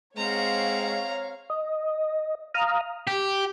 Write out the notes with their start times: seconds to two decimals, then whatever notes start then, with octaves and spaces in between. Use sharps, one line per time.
0.17 G#3 C4 C#5 F5 F#5 A#5
1.50 D#5
2.54 F5 A#5 D#6 F6
3.07 G4